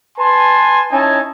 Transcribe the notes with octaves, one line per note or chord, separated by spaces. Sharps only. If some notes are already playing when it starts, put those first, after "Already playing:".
B4 G#5 A5 C6
C#4 D#4 E4 G#5 A5